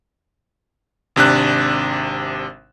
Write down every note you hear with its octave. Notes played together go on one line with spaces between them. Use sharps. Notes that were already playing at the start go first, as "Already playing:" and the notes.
G#1 C3 D4 F#6